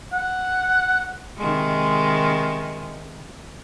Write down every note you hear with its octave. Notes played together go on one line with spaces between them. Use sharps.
F#5
C3 D#3 G#3